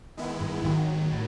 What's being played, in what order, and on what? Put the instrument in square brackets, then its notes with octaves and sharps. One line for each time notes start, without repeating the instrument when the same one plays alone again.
[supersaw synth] D#3 G#3 B3 E4
[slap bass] G1 G2
[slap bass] G#1 G#2 [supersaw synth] D#2 D#3 F#3
[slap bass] A2